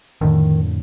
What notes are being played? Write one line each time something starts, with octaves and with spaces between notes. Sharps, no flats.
F2 A2 D3 D#3